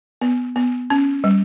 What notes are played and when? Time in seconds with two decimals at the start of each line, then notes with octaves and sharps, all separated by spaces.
0.21 B3
0.56 B3
0.90 C#4
1.24 G3